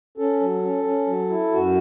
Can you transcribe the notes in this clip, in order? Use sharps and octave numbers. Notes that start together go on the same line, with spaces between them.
C#4 A4
F#3
C#4
C#4
F#3
E4
F#2 F#4